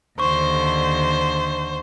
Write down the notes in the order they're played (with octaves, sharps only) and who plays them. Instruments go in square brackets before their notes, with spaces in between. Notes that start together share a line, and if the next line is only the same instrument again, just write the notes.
[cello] D#2 [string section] D3 [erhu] C5 [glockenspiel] C#6